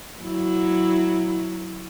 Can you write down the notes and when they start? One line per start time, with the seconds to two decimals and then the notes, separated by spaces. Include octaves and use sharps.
0.22 F#3 E4